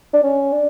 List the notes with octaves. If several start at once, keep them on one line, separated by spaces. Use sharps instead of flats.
D4
C#4
D4